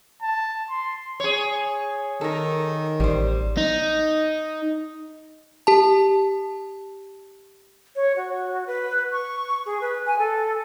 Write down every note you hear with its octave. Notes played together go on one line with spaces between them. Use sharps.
A5
C6
G#4 C#5
D#3 A4 A#4
A1 G3 C5
D#4
G4 A5
C#5
F#4
B4
C#6
G#4
B4
G#5
A4